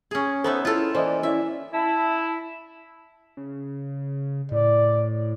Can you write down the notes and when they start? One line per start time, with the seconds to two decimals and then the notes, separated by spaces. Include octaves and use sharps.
0.11 C#4 G#4
0.44 B3 D#4 A4 C5 E5
0.65 C#4 E4 F4 A4
0.95 E3 A#3 C5 D5 D#5
1.23 C#4 E4 D5 E5
1.74 E4 A5
3.37 C#3
4.52 A2 D5